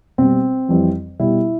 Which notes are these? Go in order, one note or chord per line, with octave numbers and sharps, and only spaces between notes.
B2 G3 C4
F2 E3 G3
B2 G3 E4